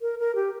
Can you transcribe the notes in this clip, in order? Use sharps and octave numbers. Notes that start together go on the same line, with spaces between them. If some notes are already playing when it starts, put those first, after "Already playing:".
A#4
A#4
G4